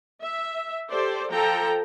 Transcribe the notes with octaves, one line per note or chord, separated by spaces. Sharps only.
E5
G4 A4 C5 D5
F3 A4 G5 A#5